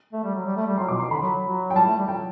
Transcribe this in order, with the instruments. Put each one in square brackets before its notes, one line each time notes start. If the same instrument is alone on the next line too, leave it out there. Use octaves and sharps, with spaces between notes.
[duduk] A3
G3
F#3
G3
A3
G3
[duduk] F#3 [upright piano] C6
[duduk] B2 [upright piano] D6
[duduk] B2 [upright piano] C6
[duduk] D3 [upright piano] B5
[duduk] F#3
F#3
[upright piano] G5
[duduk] G3 [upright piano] A5
[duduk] A3
G3
[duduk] F#3 [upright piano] G5